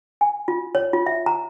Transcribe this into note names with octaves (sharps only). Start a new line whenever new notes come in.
G#5
F4
C#5
F4
E5
A#5